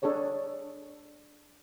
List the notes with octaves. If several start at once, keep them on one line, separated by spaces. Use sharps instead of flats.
D4 G#4 A4 C#5 D5